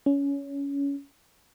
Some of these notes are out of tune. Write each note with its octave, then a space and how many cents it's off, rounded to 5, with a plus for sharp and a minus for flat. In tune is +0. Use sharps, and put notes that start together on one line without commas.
C#4 +20